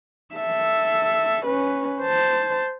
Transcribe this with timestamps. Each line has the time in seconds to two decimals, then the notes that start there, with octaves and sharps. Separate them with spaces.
0.35 A4 E5
1.46 C#4 B4
2.02 C5 A5